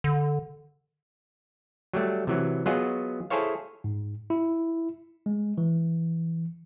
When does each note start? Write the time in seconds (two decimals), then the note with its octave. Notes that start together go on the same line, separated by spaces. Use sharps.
0.04 D3
1.93 F#3 G3 A3
2.27 C3 E3 F#3
2.66 F#3 B3 F4 F#4 G#4 D#5
3.30 E4 G#4 A4 C5 C#5 F5
3.84 G#2
4.30 E4
5.26 G#3
5.58 E3